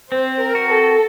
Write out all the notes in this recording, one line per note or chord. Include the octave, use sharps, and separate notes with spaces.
C4 C5
A#4
F#4
A4